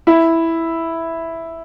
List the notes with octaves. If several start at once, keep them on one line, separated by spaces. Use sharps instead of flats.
E4